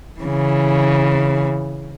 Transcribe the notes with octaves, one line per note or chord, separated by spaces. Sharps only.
C#3 E3